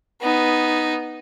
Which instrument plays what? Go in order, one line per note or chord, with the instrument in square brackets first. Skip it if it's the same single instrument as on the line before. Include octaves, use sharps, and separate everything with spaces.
[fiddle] B3 D#4